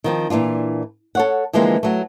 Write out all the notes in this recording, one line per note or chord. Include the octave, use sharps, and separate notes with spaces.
D#3 F3 C4
A#2 E3 D4 F4
A4 C#5 F#5
D3 E3 F3 G#3 A#3 C4
F#3 A3